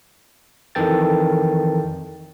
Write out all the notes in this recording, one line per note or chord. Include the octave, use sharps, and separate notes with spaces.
F2 D#3 E3 A4 G5 A6